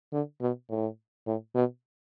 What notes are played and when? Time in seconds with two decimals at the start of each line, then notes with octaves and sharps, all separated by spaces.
0.13 D3
0.41 B2
0.70 A2
1.26 A2
1.55 B2